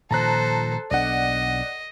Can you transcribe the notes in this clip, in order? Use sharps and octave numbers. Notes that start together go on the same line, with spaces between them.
A#2 D#3 F3 A4 C5 A5 A#5 F#6
B1 B3 D4 D5 D#5 F#5